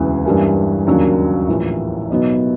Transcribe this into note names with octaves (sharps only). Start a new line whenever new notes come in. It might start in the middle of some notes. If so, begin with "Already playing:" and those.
Already playing: E1 D2 C#3 E3
G2 E3 G3 A#3 C#4
D#2 C#3 F#3 A#3 D4
A#1 A2 E3
B2 F#3 B3 D#4